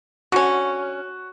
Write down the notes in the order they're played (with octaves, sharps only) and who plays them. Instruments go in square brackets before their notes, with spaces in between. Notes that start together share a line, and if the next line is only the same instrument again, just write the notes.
[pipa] D3 C#4 [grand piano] F#4